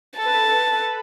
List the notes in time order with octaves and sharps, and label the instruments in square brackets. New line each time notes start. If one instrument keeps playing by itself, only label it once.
[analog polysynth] A4 [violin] A5
[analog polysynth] B4
A4
B4
A4
B4
A4
B4
A4
B4